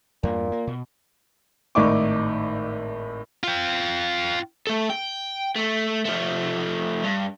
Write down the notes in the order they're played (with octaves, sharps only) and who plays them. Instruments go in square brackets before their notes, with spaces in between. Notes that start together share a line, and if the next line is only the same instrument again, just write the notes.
[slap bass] E2 G2 A#3 [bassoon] A#2
[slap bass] A#3
B2
[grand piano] G#1 A2 D#4 D5 C#6 D6
[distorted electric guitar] F4 G5
[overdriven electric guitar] A3 A4
G5
A3
F3 A3
G2